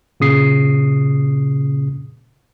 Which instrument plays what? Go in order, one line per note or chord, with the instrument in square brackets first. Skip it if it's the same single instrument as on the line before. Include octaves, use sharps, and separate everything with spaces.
[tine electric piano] A#2 C#3 D#6 C7